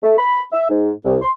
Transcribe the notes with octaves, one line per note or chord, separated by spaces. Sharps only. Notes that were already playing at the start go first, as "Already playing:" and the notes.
A3
B5
E5
G#2
C2
C6